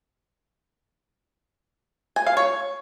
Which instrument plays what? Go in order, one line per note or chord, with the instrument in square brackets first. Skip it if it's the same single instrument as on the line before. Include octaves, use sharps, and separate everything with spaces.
[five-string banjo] G#5
F5
C#5